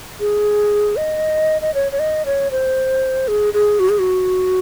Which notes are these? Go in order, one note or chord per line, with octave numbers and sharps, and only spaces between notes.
G#4
D#5
D#5
C#5
C#5
D#5
C#5
C5
G#4
G#4
F#4
G#4
F#4